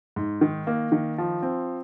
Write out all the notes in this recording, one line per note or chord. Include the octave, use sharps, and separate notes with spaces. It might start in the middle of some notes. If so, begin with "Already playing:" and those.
G#2
D#3
A#3
D#3
F3
C4